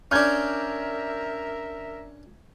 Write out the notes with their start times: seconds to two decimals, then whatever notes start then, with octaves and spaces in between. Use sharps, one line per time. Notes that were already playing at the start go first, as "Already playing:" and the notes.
0.11 C#4 D4 A#4 E5 F6 G6 G#6